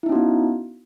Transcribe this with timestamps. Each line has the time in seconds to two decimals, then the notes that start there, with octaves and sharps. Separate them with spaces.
0.03 E4
0.06 D#4
0.09 C#4
0.12 F#4
0.15 B3